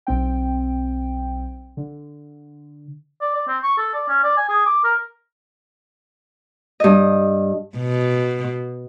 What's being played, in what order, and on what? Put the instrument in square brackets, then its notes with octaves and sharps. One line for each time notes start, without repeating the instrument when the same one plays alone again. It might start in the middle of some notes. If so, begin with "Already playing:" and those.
[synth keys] B1 C4 G5
D3
[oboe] D5
D5
C4
C#6
A4
D5
C#4
D5
G#5
G#4
D6
A#4
[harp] G2 D#5
[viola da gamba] B2